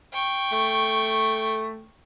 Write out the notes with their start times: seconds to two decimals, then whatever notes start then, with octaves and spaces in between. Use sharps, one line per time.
0.13 G5 C#6
0.52 A3